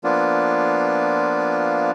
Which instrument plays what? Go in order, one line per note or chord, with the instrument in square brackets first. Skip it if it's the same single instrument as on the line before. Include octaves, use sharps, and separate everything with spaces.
[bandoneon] F3 A#3 B3 D4 F4